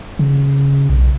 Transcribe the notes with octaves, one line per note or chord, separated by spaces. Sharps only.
C#3
B1